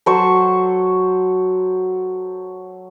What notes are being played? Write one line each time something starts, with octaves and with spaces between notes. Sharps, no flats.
F#3 A4 C5 C#6